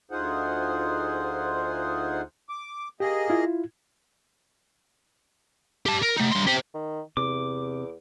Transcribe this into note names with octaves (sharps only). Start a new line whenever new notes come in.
D2 D#4 F4 G#4 C5 F#5
D6
A#3 G4 G#4 D#5
E4 F4
G4 A5
A#4
A3 D#4
G2 C6
G4 C5
D#3
E2 C3 D6